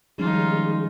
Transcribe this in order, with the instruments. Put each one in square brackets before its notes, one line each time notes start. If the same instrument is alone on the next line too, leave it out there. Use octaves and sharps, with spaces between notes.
[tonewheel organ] D#3 G#3 [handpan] F3 G3 C#4 [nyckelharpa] D#4 F4